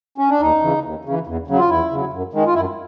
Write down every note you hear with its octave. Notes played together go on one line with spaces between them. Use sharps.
C#4
D4
D#2 D#4
C#3 E3
D#2
C#3 E3
E2
C#3 F#3
F4
E2 E4
C#3 F#3
F#2
D#3 G#3
F4
F#2 E4